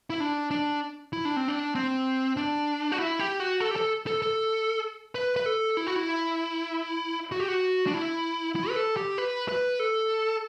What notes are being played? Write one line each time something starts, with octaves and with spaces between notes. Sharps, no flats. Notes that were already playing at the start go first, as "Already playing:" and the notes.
E4
D4
D4
E4
D4
C4
D4
C4
D4
F#4
E4
G4
F#4
A4
G4
A4
A4
A4
B4
B4
A4
E4
F#4
E4
F#4
G4
F#4
D4
E4
E4
B4
A4
G4
B4
B4
A4